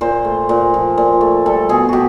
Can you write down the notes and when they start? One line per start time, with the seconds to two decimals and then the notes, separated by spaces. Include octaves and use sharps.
0.01 A#2 C5
0.25 A3
0.49 A#2
0.74 F3
0.98 A#2
1.21 A3
1.46 G3 A4
1.69 B2 G#4
1.89 B2 F#4 G4